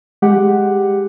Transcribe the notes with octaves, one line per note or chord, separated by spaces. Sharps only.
G#3 G4 F#5